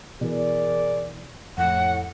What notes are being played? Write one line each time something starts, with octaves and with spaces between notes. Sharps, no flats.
B2 E3 G#4 A#4 D5
F2 A2 F#5